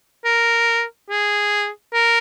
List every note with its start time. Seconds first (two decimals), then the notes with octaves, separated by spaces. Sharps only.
0.25 A#4
1.09 G#4
1.93 A#4